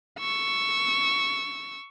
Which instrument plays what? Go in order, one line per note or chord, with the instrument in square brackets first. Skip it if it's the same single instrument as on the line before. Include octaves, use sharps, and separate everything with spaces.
[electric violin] C#6 E6